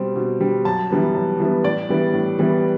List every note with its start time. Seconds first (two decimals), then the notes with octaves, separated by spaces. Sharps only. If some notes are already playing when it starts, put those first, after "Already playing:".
Already playing: B2 G3 C4
0.16 B2
0.40 G3 C4
0.65 F#2 A5
0.90 E3 G3 B3
1.15 F#2
1.40 E3 G3 B3
1.64 A2 D5
1.89 E3 G3 B3
2.14 A2
2.39 E3 G3 B3